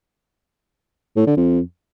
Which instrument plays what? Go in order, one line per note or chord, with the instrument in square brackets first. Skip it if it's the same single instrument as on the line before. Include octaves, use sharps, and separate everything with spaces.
[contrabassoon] A2
D3
F2